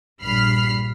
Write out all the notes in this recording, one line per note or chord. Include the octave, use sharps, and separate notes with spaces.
A#1 G2 B5 F6 C7